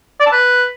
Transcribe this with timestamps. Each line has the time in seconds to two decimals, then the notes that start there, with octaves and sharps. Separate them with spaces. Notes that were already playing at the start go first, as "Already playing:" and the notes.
0.20 D5
0.26 A5
0.32 B4